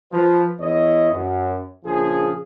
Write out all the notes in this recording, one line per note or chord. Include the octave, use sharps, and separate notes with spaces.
F3 B4
E2 E4 C#5 D#5
F#2
A#1 C#3 F3 G#4